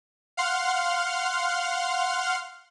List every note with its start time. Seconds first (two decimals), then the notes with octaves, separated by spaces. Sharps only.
0.37 F5 F#5 C6 F6